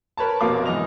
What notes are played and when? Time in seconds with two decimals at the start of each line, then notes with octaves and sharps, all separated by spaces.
0.17 A#4 B4 C#5 A5
0.41 F1 B2 A#3 F5 D6
0.66 G#2 E3 D#5 F7